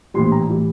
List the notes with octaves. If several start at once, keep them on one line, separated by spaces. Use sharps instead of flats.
A#1 A2 E3 G3 C6
A#5
A2 E3 G3